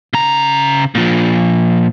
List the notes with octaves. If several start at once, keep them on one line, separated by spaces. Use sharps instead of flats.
C#3 A#5
A#2 F3